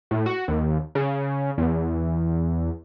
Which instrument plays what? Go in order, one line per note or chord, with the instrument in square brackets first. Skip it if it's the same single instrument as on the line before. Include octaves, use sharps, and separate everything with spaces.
[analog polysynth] A2
F#4
D#2
C#3
E2